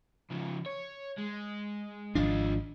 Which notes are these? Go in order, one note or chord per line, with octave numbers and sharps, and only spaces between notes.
C#3 F3
C#5
G#3
G#1 F3 D4 F4 D#5